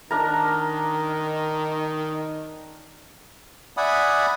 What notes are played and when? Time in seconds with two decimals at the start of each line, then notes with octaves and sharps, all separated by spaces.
0.11 D#3 D4 A#4 A#5
3.77 D5 E5 F#5 G#5 B5 D#6